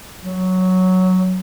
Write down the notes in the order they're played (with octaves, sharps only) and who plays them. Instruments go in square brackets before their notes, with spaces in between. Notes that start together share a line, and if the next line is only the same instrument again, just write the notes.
[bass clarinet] F#3